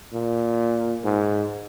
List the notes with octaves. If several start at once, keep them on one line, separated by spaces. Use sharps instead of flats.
A#2
G#2